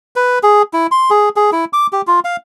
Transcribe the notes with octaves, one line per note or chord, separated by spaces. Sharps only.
B4
G#4
E4
C6
G#4
G#4
E4
D6
G4
F4
F5